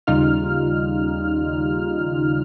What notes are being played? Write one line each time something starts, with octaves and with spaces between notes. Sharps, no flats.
D#2 C#3 G3 D#4 F4 F6